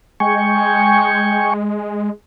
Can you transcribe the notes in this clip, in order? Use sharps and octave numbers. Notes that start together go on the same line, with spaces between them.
G#3 G5 G#5 C#6